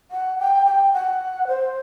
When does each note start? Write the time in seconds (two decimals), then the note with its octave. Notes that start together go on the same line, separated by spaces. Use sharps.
0.11 F#5
0.39 G5
0.66 G5
0.93 F#5
1.48 C5